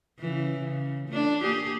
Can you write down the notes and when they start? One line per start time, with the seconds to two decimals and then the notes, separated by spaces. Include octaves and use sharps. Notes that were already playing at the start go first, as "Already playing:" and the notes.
0.20 C#3 E3
0.59 C#3
1.08 A3 D4
1.42 A#3 G4 G#4